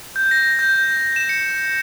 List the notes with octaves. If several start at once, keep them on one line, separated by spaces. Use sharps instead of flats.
G6
A#6
G6
E7
C#7